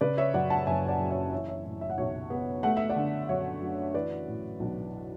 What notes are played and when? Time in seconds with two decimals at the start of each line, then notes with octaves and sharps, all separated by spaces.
0.01 C#3 B4 D5
0.17 C#5 E5
0.34 F#2 D5 F#5
0.50 F#5 A5
0.67 F#1 E5 G#5
0.88 D5 F#5
1.00 F#3
1.10 C#5 E5
1.32 E3 C#5 E5
1.48 C#5 E5
1.65 A2
1.81 E5
1.90 F#5
1.98 B1 C#5 E5
2.30 B3
2.63 A3 F#5
2.77 E5
2.89 D5 F#5
2.96 D3
3.29 F#2 C#5 E5
3.61 F#2
3.94 E3 B4 D5
4.27 A2
4.60 B1